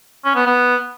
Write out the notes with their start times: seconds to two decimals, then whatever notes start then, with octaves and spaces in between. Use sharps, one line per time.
0.25 C#4
0.36 B3
0.46 B3